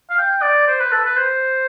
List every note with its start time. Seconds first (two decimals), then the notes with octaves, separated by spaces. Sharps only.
0.10 F5
0.18 G5
0.42 D5
0.68 C5
0.80 B4
0.92 A4
1.05 B4
1.17 C5